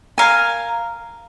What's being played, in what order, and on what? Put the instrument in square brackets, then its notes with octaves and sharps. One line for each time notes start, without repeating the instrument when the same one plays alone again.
[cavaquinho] A#4 F5 G#5